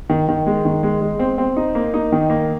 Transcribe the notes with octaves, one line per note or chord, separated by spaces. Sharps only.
D#3
D#3
G#3
D#3
G#3
G#3
C4
C4
D#4
A#3
D#4
D#3
A#3